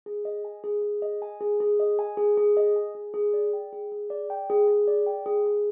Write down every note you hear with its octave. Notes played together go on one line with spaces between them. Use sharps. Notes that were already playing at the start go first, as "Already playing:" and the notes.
G#4
D#5
G#5
G#4
G#4
D#5
G#5
G#4
G#4
D#5
G#5
G#4
G#4
D#5
G#5
G#4
G#4
D5
G5
G#4
G#4
D5
G5
G#4
G#4
D5
G5
G#4
G#4